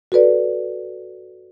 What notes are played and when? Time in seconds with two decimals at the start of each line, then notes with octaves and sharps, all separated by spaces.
0.12 F#4 A4 B4 D5